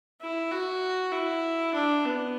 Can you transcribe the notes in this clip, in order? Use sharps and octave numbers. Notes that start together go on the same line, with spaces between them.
E4
F#4
E4
D4
B3